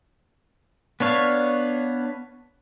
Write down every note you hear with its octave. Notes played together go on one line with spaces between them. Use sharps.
B3 D4 C#5 F5